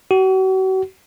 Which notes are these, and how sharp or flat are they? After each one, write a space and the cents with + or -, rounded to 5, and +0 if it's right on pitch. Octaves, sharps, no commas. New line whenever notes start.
F#4 +40